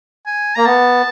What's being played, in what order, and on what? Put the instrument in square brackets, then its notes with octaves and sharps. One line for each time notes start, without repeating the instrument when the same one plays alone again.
[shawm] G#5
[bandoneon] A#3 [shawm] A#5
[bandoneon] B3 [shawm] A5